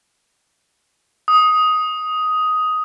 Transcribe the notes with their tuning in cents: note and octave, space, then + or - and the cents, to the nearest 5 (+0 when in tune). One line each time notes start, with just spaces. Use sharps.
D#6 +10